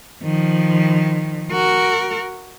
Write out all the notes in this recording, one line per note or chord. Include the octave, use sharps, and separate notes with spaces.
D#3 F3
F#4 A#4